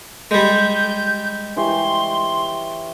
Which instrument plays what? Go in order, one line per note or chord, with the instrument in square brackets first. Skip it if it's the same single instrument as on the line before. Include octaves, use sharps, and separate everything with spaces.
[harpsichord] G3 G#3 [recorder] G6
[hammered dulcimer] E3 G4 C#5 [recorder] C6